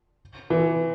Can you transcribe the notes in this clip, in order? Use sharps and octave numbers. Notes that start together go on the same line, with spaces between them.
E3